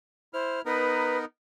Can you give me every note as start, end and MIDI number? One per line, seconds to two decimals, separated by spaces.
0.34 0.62 64
0.34 0.60 72
0.34 0.62 89
0.66 1.25 59
0.66 1.25 63
0.66 1.25 70
0.66 1.18 71